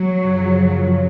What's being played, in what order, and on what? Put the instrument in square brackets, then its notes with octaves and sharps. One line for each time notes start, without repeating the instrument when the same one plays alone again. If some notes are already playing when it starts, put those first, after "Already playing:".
Already playing: [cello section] F#3
[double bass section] F#2 C#3 F3